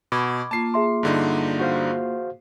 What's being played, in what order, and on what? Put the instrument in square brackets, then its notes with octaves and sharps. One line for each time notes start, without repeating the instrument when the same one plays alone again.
[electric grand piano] B2 [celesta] B5 C#6 G#6 [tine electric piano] D6
[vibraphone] A#3 F4 [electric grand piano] A5 C7
[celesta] G#4 E5 C6
[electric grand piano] G2 D3 D#4
[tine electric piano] F#4 C5 F5